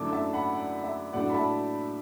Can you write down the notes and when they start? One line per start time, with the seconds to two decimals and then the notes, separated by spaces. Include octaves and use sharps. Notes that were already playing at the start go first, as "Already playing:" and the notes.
Already playing: F#2 D3 A3 E4 A5 D6
0.13 E5 A5
0.33 F#5 B5
0.53 D5 F#5
0.84 E5
1.13 A2 F#3 A3 D4 D5 F#5
1.30 B5
1.34 E5 A5